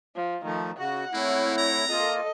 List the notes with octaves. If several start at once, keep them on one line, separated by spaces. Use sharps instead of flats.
F3
D#3 F3 A3
C#3 F#4 F#5
A3 A#3 C4 E4 C#5
A#5
A#3 F4 A4 D#5